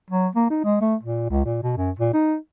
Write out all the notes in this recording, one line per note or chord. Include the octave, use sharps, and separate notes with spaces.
F#3
A#3
D#4
G#3
A3
A#2
C#2
A#2
B2
F#2
A#2
D#4